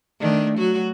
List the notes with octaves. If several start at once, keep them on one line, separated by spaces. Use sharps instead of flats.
D#3 A3 D4
F#3 F#4